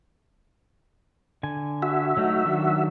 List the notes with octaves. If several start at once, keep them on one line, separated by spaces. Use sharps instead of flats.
D3 G#5
F#4 E5
F#3 A3 D#4
D#3 F#3 D4